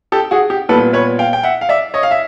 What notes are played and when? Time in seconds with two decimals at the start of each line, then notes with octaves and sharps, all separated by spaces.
0.12 G4 A4
0.31 F#4 G#4
0.50 G4
0.69 A#2 G3 B3 A4 B4
0.93 B4 C#5
1.19 F5 G5
1.33 G5
1.43 E5 F#5
1.61 F5
1.69 D5 E5
1.94 C#5 D#5
2.03 F5
2.11 E5